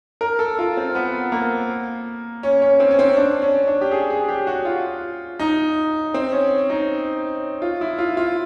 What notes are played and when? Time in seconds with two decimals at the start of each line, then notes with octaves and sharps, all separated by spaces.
0.21 A#4
0.39 A4
0.59 F4
0.77 C4
0.95 B3
1.32 A#3
2.43 C#4
2.62 C#4
2.80 C4
2.91 C#4
2.99 C4
3.17 D4
3.42 C#4
3.67 D4
3.81 G4
3.91 G#4
4.10 G#4
4.28 G4
4.47 F#4
4.65 F4
5.40 D#4
6.14 C4
6.32 C#4
6.70 D#4
7.62 F4
7.81 E4
7.99 F4
8.17 F4